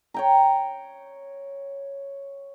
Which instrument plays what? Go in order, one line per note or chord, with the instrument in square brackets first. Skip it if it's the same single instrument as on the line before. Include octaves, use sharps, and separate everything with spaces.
[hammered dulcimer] C#5 G5 A#5